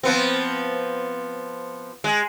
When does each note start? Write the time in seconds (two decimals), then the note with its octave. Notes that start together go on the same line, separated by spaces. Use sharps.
0.03 F3 B3 C4
2.04 G#3